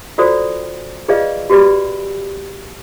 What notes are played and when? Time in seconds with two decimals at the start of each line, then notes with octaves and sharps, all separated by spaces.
0.18 F4 F#4 A4 C5 D5 D#6
1.09 F4 G#4 B4 D5 D#5 F5
1.50 F#4 G4 B4 D5 B5